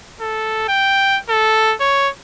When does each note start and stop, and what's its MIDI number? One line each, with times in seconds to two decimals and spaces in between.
0.21 0.66 69
0.69 1.19 79
1.29 1.75 69
1.80 2.09 73